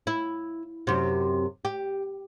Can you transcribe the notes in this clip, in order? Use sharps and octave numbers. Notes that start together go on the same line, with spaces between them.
E4
F#2 C3
G4